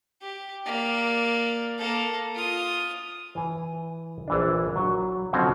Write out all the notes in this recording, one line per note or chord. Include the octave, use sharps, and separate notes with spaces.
G4
A#3 D5
A#3 A4
F4 D#6
E3 G#5
A#1 E3 D4
F#3
B2 D3 F3 F#3 C4 C#4